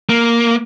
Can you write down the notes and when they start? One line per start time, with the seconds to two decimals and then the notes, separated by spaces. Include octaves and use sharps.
0.09 A#3